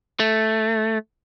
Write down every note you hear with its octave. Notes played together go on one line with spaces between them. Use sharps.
A3